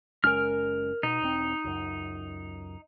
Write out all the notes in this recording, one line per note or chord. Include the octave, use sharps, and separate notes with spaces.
F#1 G#3 C#4 A#4 F6
B2 D#4
E1 C4
C#2 F#2